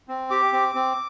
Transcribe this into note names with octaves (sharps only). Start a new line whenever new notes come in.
C4
G4 D6
C4
C4